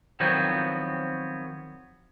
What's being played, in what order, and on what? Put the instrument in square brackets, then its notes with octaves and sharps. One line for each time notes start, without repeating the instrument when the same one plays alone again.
[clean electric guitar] D#3 F3 F#3 B3 C4